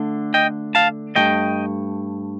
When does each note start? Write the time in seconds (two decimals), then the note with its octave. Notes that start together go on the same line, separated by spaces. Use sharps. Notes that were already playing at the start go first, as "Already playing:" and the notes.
Already playing: D3 A3 D4
0.34 D#5 G5
0.75 F5 A5
1.15 G2 F3 A3 D#5 G5